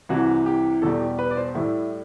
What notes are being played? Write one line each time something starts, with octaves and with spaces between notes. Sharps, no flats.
C2 C3 E3 F#4
G4
E2 B2 G3 A4
G4
B4
D5
C5
A2 G3 E4